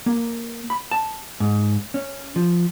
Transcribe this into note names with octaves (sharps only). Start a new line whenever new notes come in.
A#3
B5
A5
G#2
C#4
F3